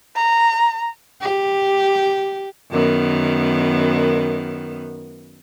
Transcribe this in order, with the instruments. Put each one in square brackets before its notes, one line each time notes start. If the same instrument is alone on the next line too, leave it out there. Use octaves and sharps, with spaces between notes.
[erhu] A#5
[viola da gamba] G4
F#2 D#3 B3